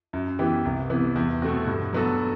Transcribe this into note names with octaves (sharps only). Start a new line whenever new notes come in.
F#2
E3 B3 E4 G4
C2
C3 E3 B3
E2
B2 A3 C4 F#4
G2
F#3 B3 F#4 A4